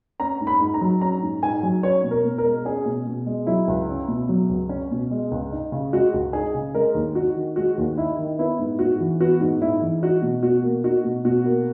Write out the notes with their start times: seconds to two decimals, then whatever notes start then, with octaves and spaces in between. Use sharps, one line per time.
0.20 C#4 A#5
0.41 G#2
0.47 B5
0.61 G#2
0.74 A#5
0.81 F#3
1.01 C#4 A#5
1.22 G#2
1.43 G#2 G#5
1.63 F#3
1.83 C#4 C#5
2.04 B2
2.11 A#4
2.25 B2
2.38 A#4
2.45 G#3
2.65 C#4 G#4
2.86 B2
3.07 B2
3.26 G#3
3.47 F#3 E4
3.68 C#2
3.88 C#4
4.08 B2
4.29 F#3
4.49 C#2
4.69 C#4
4.91 B2
5.11 G#3
5.31 C#2
5.52 D#4
5.72 C#3
5.93 G#3 F#4
6.14 C#2
6.33 D#4 G#4
6.55 C#3
6.75 G#3 A#4
6.95 D#2
7.15 D#4 F#4
7.36 D#3
7.56 G#3 F#4
7.78 D#2
7.97 D#4 E4
8.18 D#3
8.39 B3 E4
8.59 G#2
8.79 G#2 F#4
9.00 E3
9.20 B3 F#4
9.41 G#2
9.61 G#2 E4
9.81 E3
10.03 D#4 F#4
10.22 B2
10.43 B2 F#4
10.63 A#3
10.84 D#4 F#4
11.05 B2
11.25 B2 F#4
11.46 A#3